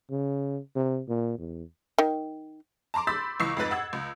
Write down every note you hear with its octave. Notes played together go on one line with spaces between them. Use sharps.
C#3
C3
A#2
E2
D#3
A5 A#5 C6 D6
B5 C6 E6 G6 A6 B6
C#2 E3 C#6 E6 C7
F2 G#2 B4 A6
F#5 E6 G#6
C#2